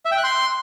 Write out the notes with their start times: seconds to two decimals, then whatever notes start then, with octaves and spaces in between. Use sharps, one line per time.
0.05 E5
0.12 G5
0.18 F#6
0.24 C6